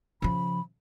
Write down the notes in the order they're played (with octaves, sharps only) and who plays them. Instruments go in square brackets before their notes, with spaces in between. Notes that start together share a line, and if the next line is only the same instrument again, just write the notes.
[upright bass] C#3 F3 [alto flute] B5